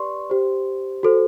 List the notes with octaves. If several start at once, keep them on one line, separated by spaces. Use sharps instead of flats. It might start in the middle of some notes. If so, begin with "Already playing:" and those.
Already playing: G4 B4 D5 C6 C#6
G4 C5
F#4 A4 C5